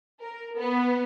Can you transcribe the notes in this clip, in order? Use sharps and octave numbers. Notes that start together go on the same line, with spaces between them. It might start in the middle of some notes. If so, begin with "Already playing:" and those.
A#4
B3